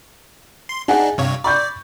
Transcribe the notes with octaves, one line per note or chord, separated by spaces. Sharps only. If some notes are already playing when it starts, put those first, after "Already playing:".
C6
D4 D#4 G#4 F#5 G#5
G2 C3 C#5 F5
D5 B5 C#6 G6